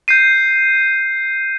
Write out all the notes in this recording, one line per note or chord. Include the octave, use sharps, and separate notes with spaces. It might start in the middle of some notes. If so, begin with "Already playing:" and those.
G6 C7 D#7